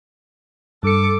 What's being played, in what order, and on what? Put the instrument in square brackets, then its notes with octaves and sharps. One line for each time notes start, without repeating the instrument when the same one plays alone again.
[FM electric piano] G2 C#7 [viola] A4 D6